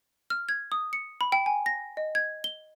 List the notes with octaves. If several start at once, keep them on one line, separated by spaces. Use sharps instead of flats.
F6
G#6
D#6
C#7
B5
G5
G#5
A#6
D#5
G#6
G7